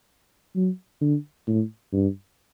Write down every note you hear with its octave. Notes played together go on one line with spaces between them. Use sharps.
F#3
D3
A2
G2